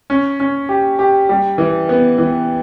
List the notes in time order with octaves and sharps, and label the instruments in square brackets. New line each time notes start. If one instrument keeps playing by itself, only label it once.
[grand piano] C#4
C#4
G4
G4
G3
E3
B3
E3